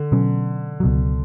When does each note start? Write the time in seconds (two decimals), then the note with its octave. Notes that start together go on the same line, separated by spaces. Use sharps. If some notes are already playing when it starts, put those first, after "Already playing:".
Already playing: D3
0.12 B2 F#3 C#4
0.80 C#2 B2 F#3